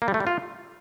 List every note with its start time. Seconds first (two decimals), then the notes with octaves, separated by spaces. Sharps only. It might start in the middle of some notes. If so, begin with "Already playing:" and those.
0.02 A#3
0.08 G3
0.14 A3
0.20 G3
0.27 F4